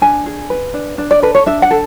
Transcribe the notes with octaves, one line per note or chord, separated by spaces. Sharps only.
D4 G#5
G#4
B4
D4
D4
D5
A4 B4
C#5
D4 E5
F#5
A4